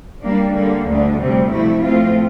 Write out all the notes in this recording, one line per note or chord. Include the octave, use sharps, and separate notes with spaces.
G3 A#3 D4
D3 G3 A#3
D2 D3 G3 D4
D2 C3 G3 C4
C3 F3 A3 E4
A2 F3 A3 C4 F4